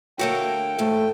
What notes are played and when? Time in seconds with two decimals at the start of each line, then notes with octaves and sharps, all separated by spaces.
0.19 D3 A3 A#3 F#4 C#5 G5
0.78 D#2 G#2 E3 A3